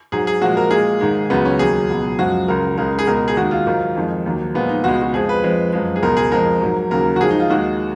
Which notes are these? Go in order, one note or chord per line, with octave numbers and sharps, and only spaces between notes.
G#2 F#3 G#4
G#4
A#2 F3 G#3 F#4
A#4
A#2 G#3 G#4
G#2 D#3 G#3
C#2 C#3 F#3 B3
C#4
D#2 D#3 F#3 G#4
C#2 B2 F#3
F#2 F3 G#3 F#4
C#2 C#3 F#3 A#4
C#2 C#3 G#3 A#4
G#4
C#2 B2 G#3 A#4
G#4
D#2 D#3 G#3 F#4
F4
G#2 D#3 F#3
F2 D#3 G#3
D#2 D#3 F#3
A#2 F3 G#3 B3
D#4
C#2 B2 G#3 F#4
F#4
F2 F3 G#3 G#4
B4
F2 F3 G#3
F#2 F3 G#3
G#4
C#2 B2 G#3 A#4
G#4
F2 F3 G#3 A#4
G#2 F#3
D#2 C#3 F#3 A#4
F#4
G#2 F3 G#3 G#4
D#4
F4
D#2 D#3 G#3 F#4